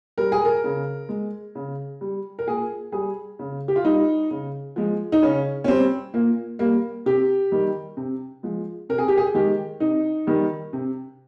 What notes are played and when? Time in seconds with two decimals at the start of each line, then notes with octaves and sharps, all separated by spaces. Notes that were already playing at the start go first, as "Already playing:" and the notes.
0.18 G3 A#4
0.32 G#4
0.45 A#4
0.64 C#3
1.09 G#3
1.55 C#3
2.01 G3
2.39 A#4
2.47 A#2 G#4
2.92 G3 G#4
3.39 C#3
3.68 G4
3.76 F4
3.84 G3 D#4
4.31 C#3
4.76 F3 G#3
5.12 D#4
5.22 C#3 C#4
5.64 C#4
5.68 G3 C4
6.14 A#2 A#3
6.59 G3 A#3
7.06 C3 G4
7.52 D#3 G3
7.97 C3
8.43 F3 G#3
8.89 C3 A#4
8.98 G#4
9.08 G4
9.18 G#4
9.35 D#3 G#3 G4
9.80 C3 D#4
10.27 D#3 G3
10.73 C3